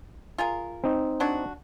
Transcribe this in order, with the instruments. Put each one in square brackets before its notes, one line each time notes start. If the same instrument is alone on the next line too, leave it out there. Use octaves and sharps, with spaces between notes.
[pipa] F4 G#4 A#4
[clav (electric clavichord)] C4 D#4
[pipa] F#3 D4 F#4